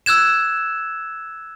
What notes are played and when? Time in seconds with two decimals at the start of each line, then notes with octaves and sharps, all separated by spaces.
0.06 E6 F#6 G#6 E7